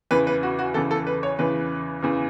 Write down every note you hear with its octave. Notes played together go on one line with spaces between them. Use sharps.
E2 C#3 E3 B4
B4
F#4
F#4
E2 C#3 E3 A4
A4
B4
C#5
E2 C#3 E3 B4
E2 C#3 E3